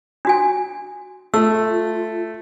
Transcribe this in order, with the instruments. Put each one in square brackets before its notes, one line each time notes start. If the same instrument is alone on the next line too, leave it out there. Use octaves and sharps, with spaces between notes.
[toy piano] D4 F#4 G#5
[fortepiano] A3 [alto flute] F4 [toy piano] E6